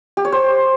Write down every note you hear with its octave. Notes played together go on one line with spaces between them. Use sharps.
G4
C#5
C5